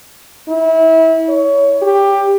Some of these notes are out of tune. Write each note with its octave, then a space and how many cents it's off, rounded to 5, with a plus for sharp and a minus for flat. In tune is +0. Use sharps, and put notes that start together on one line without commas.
E4 -30
C#5 +20
G4 +15